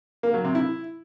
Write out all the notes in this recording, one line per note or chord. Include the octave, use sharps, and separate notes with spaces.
A#3
F#3
C3
E4